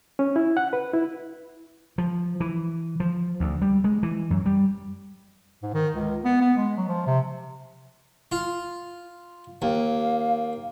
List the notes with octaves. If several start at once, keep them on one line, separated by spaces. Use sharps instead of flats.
C#4
E4
F#5
B4
E4
F3
E3
F3
D2
G3
G#3
E3
F#2
G3
G#2
D#3
C#2
B3
B3
G#3
F#3
F3
C3
F4
D#2 F5